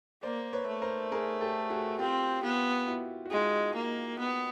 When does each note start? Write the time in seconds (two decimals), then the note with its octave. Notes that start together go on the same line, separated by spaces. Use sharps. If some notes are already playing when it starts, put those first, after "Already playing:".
0.23 A#3 C5 D5
0.53 B4 C#5
0.67 A3
0.82 A#4 C5
1.12 G#4 A#4
1.41 G4 A4
1.70 F#4 G#4
1.99 C4 F4 G4
2.43 B3 F4 G4
2.87 E4 F#4
3.26 F#4
3.31 G#3 D#4 F4
3.75 A#3
4.19 B3